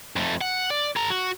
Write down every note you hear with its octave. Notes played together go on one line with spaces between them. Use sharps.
F2 A3
F#5
D5
A4 A#5
F#4